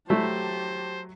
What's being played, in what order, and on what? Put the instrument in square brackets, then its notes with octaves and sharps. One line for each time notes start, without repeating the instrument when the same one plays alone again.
[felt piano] F#3 [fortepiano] A3 E4 [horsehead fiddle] G4 A5 [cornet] C5